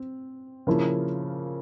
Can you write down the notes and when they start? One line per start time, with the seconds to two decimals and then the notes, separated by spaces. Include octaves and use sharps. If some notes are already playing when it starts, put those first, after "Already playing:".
Already playing: C4
0.67 C#3 F3 A#3 E4